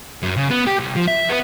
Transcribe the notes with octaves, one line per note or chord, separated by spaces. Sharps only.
F#2
C#3
B3
G4
C2
F3
E5
B3